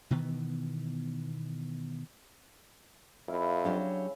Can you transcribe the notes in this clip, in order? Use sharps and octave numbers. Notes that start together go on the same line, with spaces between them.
B2 D#3 E3 B3
F2 E4 E5 F5
C#3 F#3 D4 G4